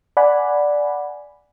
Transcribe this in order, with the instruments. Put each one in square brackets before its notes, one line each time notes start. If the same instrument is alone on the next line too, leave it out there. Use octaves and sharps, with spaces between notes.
[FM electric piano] D5 F#5 G#5 B5